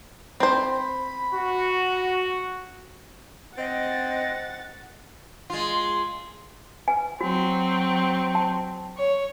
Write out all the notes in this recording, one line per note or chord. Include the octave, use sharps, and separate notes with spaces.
C4 C5 B5
F#4
C4 D#5 F#5 A6
G#3 F4
B4 G#5
F#3 C4 F#4
A5
C#5